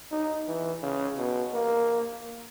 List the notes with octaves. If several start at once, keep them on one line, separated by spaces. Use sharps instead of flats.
D#4
E3
C#3
B2
A#3